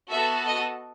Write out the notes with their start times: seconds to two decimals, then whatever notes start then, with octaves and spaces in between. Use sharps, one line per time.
0.11 B3 F#4 A4 E5
0.47 D#5